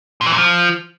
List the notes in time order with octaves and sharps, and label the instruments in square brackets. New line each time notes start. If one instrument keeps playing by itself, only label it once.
[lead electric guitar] A#2
E3
A#2
F3